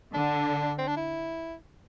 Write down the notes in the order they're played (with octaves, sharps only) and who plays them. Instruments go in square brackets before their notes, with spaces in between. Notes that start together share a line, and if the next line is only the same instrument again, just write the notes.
[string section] D3 [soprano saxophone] D4
[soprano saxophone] C4
D4
E4